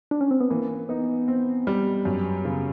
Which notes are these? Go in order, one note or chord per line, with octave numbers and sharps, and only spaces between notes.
D4
C#4
C4
B3
E3 A#3
B3 D#4
C4
G3
F#2
C#3